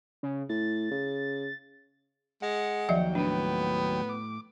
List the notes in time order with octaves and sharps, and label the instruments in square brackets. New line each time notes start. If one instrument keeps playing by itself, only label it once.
[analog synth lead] C#3
[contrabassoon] A2 [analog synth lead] A6
[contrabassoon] C#3
[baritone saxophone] G#3 [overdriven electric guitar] F#5
[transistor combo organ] D#2 F#3 G5 [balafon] F3 D5 E5
[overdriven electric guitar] A2 [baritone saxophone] B3 [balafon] D4
[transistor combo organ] D6